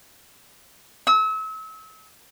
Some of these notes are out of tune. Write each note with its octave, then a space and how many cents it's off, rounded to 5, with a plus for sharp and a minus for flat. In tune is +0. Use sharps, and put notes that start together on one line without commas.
E6 -35